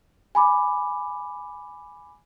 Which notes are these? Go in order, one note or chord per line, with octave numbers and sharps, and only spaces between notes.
G#5 B5 D6